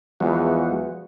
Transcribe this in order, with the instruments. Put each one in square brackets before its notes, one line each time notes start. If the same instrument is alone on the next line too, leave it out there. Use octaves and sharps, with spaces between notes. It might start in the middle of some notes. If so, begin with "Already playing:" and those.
[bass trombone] E2 [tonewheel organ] F3 G#3 F#4